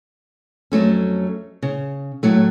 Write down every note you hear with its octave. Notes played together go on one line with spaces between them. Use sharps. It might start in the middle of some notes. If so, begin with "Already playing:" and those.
F2 F#3 A3 C#4
C#3
A2 F#3 A3